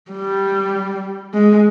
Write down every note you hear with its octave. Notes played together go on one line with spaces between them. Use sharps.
G3
G#3